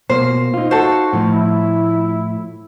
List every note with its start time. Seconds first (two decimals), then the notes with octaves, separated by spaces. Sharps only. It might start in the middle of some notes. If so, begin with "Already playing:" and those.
0.10 B2 A#3 C5
0.54 D#4 F4
0.71 F#4 A4 C5
1.13 A2 F3
1.29 E4